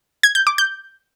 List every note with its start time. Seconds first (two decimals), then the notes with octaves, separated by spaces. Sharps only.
0.23 G#6
0.35 G6
0.47 D6
0.58 G6